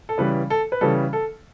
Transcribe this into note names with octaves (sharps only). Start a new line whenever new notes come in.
A4
C#3 E3 G3 B4
A4
B4
C#3 E3 G3 A4
A4